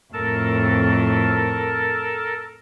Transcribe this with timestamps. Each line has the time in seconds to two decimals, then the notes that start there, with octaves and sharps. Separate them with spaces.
0.13 F2 A2 A4 A#4 A5